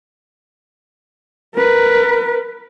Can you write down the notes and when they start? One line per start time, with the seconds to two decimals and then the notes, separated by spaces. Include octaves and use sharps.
1.55 A#4 B4